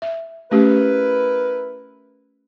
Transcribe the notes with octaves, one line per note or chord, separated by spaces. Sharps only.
E5
A3 C#4 E4 G4 A#4 B4